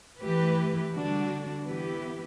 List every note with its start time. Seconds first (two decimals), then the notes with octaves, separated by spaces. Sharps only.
0.20 E3 A3 E4 G4 B4
0.93 D3 G3 D4 F#4
1.65 E3 B3 E4 G4 B4